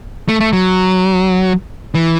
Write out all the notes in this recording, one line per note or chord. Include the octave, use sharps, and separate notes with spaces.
A3
A3
F#3
E3